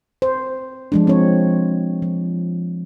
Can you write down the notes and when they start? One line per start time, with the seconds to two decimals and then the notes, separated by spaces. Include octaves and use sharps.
0.22 C5
0.92 F3 G#3 D4
1.07 C4 C#5
2.02 F3